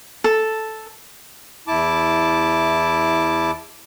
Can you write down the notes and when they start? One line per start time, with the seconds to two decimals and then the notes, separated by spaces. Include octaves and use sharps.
0.24 A4
1.68 E2 E4 A5 D6